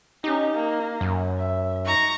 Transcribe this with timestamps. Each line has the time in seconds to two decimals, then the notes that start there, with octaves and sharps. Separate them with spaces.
0.24 C#4 D#4 G4
0.55 A#3
1.01 F#2
1.37 E5
1.85 D#4 A#5 C#6